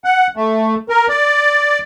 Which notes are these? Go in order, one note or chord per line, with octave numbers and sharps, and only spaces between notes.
F#5
A3
A#4
D5